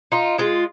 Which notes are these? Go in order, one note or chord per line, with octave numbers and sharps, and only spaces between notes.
D#4 F4
G#3 F4